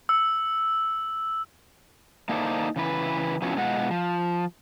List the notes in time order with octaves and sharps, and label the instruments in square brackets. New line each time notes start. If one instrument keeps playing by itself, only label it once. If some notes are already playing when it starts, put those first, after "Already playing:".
[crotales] E6
[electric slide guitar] A#3 D#4 E4 A4 C5 D5
C#3 E3 B4
F3 B3 C#4 E4 F#4 C#5
B2 G#3 F4 D#5 F#5
F3